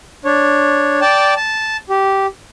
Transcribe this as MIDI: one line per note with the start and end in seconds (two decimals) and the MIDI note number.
0.25 1.00 62
0.25 1.00 73
1.01 1.34 74
1.01 1.34 79
1.01 1.34 81
1.37 1.77 81
1.89 2.26 67